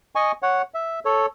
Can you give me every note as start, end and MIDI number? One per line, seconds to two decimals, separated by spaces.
0.15 0.32 75
0.15 0.32 80
0.15 0.32 85
0.42 0.62 73
0.42 0.62 78
0.74 1.00 76
1.05 1.26 69
1.05 1.26 73